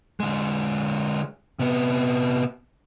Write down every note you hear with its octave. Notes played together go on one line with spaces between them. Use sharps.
D3 G#3
C3 B3